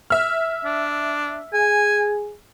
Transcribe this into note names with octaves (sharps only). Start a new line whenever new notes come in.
E5 F6
D4
G#4 G#5